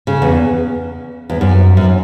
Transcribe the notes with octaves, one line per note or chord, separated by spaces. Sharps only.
C#3
E2
E2
F#2
F#2